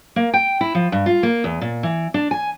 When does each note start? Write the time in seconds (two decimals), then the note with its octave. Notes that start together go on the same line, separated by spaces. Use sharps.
0.16 A#3
0.34 G5
0.61 E4
0.75 F3
0.92 G2
1.06 F4
1.23 A#3
1.44 E2
1.61 A#2
1.83 E3
2.14 D4
2.31 G#5